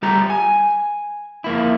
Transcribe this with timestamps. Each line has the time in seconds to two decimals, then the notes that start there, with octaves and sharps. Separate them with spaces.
0.02 G3 A3 G4 A#5
0.30 G#5
1.44 F2 A#3 E4